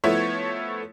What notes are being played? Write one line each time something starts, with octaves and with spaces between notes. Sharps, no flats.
F3 A3 B3 E4 C#5